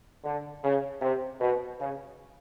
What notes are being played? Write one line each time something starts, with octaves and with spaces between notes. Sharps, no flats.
D3
C#3
C3
B2
C#3